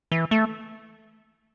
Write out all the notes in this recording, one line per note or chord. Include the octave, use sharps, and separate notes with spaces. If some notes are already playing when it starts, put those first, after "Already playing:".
E3
A3